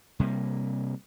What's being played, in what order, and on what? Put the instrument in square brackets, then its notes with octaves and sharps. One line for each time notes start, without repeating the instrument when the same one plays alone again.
[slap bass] C3 G3 G#3 A#3